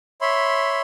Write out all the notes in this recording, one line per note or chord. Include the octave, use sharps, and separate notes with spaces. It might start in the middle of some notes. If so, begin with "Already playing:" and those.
C#5 E5 B5 C6